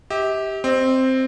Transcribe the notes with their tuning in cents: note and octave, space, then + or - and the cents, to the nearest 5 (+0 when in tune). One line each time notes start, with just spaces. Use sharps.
G4 +0 E5 -45
C4 +0 D#5 -35